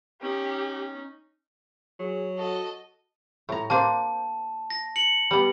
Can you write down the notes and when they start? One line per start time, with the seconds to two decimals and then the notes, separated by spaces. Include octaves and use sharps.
0.22 C#4 D#4 G4
1.99 F#3 G#4
2.38 F#4 A4 D#5
3.49 A2 A#5
3.70 A#3 D4 C5 A5
4.70 A#6
4.96 C#7 F#7
5.31 G3 B3